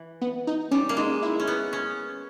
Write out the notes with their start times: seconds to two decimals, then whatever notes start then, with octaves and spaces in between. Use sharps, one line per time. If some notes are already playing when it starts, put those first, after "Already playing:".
Already playing: E3
0.21 B3
0.47 D#4
0.71 G3 C#4
0.89 A#3
0.97 G#3 D#4
1.22 E4
1.40 C#4
1.47 B3
1.73 C#4